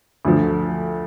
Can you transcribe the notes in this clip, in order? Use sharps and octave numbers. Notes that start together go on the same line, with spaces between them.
D2 D3 F3